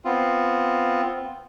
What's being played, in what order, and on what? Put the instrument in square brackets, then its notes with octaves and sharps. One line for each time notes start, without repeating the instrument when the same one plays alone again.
[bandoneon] B3 C4 F4